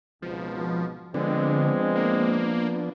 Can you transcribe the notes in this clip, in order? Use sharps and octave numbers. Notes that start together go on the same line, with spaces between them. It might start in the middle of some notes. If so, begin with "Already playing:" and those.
G#1 C#2 B2 F3
D3 F3 G#3 B3 C4 D4
A#3